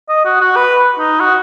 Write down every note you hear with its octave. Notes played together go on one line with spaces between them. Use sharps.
D#5
F#4
F#4
B4
D#4
F#4